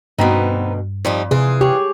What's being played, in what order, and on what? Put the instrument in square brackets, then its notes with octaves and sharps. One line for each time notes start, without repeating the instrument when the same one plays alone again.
[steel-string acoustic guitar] D2 B2 [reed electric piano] G2 [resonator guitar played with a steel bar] B3 C4 D#4
[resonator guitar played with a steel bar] F2 [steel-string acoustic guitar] F3 G3 D#4
[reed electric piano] C3 [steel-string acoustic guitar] E3 F4 [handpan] G#4
[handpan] G4 [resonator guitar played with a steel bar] G#4 C#5